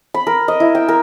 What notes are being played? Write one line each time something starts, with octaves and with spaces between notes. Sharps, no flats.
B5
A#4
D#5
E4
G5
A#4